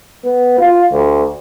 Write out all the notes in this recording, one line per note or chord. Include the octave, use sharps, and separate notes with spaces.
B3
F4
D2